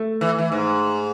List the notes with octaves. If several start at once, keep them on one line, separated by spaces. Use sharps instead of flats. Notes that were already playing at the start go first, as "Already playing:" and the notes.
Already playing: A3
E3
E3
G#2